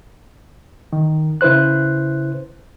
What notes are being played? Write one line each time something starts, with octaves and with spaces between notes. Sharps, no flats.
D#3
C#3 E4 B4 C5 F#6